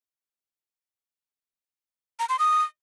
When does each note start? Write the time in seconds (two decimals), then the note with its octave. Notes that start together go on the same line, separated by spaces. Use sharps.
2.19 A#5
2.29 C6
2.39 D#6